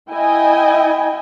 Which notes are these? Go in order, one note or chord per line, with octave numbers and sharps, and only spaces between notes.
E4 D#5 G5 G#5